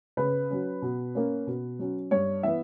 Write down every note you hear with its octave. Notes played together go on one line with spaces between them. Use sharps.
C#3 B4
F#3 C#4
B2
A#3 C#4
B2
F#3 C#4
G2 C#5
E3 B3 E5